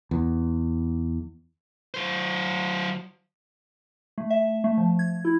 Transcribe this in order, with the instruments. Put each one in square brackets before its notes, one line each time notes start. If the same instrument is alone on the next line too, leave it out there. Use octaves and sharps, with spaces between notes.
[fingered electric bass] E2
[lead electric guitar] F#3 C5
[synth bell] A3
E5
A3
F3
G#6
E4